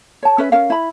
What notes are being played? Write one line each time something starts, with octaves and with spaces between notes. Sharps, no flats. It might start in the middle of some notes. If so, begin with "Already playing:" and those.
C#5 A5
C#4 B4 E5
C#4 A#4 F5
E4 B5